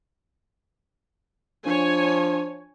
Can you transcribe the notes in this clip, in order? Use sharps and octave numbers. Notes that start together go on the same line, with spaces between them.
F3 D4 C#5 G#5